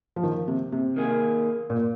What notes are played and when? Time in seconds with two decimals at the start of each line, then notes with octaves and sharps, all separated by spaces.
0.16 F3
0.23 D#3
0.48 C3
0.72 C3
0.96 D#3 A#3 G#4
1.70 A#2